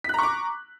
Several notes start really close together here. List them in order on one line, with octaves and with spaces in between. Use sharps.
B6 F#6 A#5 C#6 D6